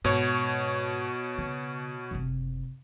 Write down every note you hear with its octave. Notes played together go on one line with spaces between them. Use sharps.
G#2 B2 C#5
C#3
F#1 C3